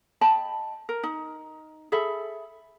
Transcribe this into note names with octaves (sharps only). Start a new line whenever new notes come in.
D#5 G5 A5 B5
A#4
D#4
G#4 A4 E5 B5